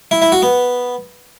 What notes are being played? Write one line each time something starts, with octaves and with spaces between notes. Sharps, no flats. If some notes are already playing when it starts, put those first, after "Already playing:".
E4
E4
F#4
B3